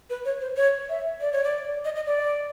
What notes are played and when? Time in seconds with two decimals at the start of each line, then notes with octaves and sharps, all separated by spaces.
0.10 B4
0.25 C#5
0.40 C5
0.56 C#5
0.89 E5
1.21 D5
1.32 C#5
1.44 D5
1.85 D#5
1.96 D#5
2.06 D5